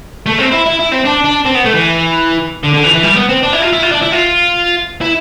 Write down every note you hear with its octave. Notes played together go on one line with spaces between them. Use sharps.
A3
C4
E4
E4
E4
C4
D4
D4
C4
B3
A3
E3
D3
D3
E3
E3
G3
B3
C4
D4
E4
F4
E4
F4
D4
E4
F4
E4